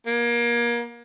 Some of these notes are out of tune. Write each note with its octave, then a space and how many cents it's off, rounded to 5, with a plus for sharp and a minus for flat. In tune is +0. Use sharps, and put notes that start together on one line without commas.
A#3 +30